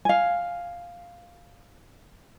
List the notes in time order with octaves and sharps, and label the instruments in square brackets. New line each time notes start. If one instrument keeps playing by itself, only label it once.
[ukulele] F5 G#5